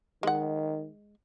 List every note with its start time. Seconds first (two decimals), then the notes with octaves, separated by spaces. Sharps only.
0.23 D#3 G#3 F#5